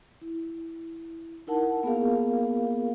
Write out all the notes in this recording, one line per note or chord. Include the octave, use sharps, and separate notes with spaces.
E4
D#4 E4 A#4 F#5 A5
A#3 B3 F4 G#4 A#4 F5